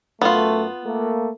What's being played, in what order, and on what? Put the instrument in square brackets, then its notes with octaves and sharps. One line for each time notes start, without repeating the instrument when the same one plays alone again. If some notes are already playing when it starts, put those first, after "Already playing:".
[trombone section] F#2 A3 [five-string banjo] B3 F4
[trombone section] A3 A#3